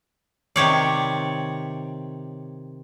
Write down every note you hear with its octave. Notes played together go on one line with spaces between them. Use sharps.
C3 D#3 C#5 D5